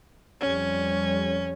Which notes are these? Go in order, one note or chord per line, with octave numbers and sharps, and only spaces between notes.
F2 G3 C#4